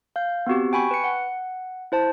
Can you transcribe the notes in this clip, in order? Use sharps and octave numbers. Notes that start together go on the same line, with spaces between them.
F5 G6
B3 C4 F#4 G4
G5 G#5 B5 C#6
B4 C#7
F#5
E4 C5 A5